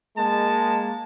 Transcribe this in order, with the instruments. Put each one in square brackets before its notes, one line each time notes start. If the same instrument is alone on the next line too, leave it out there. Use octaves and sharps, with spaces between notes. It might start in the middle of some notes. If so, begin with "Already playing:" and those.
[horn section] G#3 A#3 [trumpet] A5